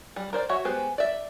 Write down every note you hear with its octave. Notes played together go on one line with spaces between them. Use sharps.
G3
A#4 C5 D5
F#4 C#5 E5
G#3 B3 G4 B4 C5
D5 E5